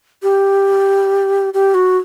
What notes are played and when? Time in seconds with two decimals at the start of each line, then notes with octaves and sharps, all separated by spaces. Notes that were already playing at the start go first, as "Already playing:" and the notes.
0.23 G4
1.54 G4
1.74 F#4